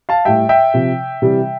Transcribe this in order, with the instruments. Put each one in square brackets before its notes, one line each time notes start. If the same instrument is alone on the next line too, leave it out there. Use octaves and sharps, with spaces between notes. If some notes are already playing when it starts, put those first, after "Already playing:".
[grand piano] F5 A5
A2 G3 E5 G5
E5 G5
C3 F3
C3 E3 G3